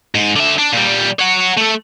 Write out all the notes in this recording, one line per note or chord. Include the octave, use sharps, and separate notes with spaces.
G#2
D3 E5
D4
A#2 G3
C#5 F#5
A3 A4